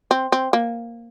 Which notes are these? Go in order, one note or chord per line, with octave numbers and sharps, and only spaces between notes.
C4
C4
A#3